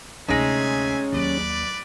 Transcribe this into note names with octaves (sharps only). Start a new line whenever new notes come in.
D2 C3 G#3 C4 C#4 D#4 E5 G#5
D#2 F#3 B4 D5